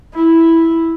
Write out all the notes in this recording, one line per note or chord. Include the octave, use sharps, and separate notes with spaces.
E4